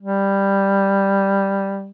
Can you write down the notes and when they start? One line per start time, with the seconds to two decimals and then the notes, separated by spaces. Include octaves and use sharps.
0.01 G3